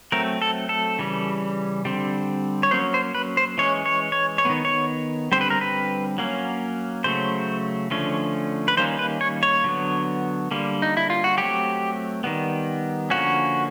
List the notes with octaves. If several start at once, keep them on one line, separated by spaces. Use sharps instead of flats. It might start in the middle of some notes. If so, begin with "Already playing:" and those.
F#3 A3 C4 A#4
A4
A4
C#3 E3 G3
D3 G3 C4
C#5
F#3 A#3 C#4 C5
C5
B4
C5
E3 G#3 C#4 C#5
C#5
C#5
C#5
D#3 G#3 B3
C#5
D3 G3 C4 C5
B4
A#4
B4
F#3 A#3 C#4
C#3 F#3 A3 C5
D3 F3 A3 C#4
B4
D#3 G3 A#3 C#4 C5
B4
C#5
C#5
D3 F#3 B3
D3 G3 A#3
D#4
E4
F4
F#4
F#3 A3 C4 G4
D#3 G3 B3
D3 F3 A#3 C#4 F#4